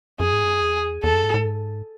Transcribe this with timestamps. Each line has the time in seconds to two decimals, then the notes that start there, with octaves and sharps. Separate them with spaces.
0.20 F#2 G#4
0.33 G#2
0.44 F#2
0.61 E2
1.03 E2 A4
1.13 F#2
1.24 G#2
1.34 A2
1.45 G#2